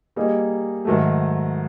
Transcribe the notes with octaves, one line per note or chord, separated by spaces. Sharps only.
G3 A#3 D#4 G#4
G#2 D#3 F#3 A3